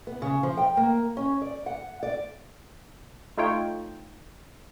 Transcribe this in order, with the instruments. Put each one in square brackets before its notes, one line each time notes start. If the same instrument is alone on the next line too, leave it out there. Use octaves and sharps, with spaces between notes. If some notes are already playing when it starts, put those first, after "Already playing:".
[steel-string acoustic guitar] B3
C#3
F3
G5
A#3
C#4
D5
F#5
D5
[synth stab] A3 D#4 F4 C#5 G5